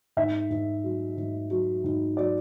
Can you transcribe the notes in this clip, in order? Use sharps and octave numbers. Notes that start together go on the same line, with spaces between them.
G#2 E5
G#2
F#3
G#2
F#3
G#2
F#3 D5